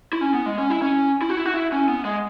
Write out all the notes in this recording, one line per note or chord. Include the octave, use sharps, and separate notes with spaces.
E4
C#4
B3
G#3
C#4
E4
C#4
E4
F#4
E4
F#4
E4
C#4
B3
G#3